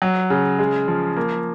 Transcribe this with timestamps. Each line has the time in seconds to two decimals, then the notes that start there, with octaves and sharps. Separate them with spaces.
0.02 F#3
0.30 C#3
0.59 G#3
0.88 F3
1.17 A#3